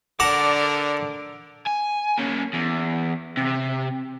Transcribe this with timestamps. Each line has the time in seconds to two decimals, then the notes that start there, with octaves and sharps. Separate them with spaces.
0.20 D3 A#4 D5 F#5 A5 A#5 D6
1.67 G#5
2.18 A#3 C#4
2.54 E2
3.37 C3